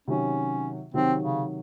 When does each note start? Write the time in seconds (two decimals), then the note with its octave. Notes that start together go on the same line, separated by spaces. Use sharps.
0.08 C3 D#3 F#3 C#4
0.94 C3 D#3 F#3 C4
1.23 C#3